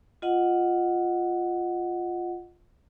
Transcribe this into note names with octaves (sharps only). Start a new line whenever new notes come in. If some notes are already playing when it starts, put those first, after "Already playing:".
F4 D#5 F#5